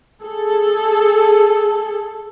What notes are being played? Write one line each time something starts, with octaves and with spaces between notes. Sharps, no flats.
G#4 A4